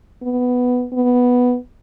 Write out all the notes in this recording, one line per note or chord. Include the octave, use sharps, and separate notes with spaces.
B3
B3